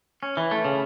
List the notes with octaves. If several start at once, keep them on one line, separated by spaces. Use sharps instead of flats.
C#4
E3
A3
C#3